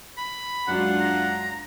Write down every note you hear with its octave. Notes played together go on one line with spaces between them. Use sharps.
B5
F#2 G#3 D4 F4 F#4 F#5
A#5